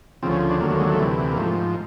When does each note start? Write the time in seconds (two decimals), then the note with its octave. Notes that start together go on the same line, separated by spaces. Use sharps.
0.23 D2 C#3 F3 C4
0.32 C#4
0.51 D4
0.61 D#2 D3 F#3 A#3
0.70 A3
0.80 G#3
0.89 A3
0.99 D2 C3 E3
1.32 A#3
1.37 G#2 F3 A3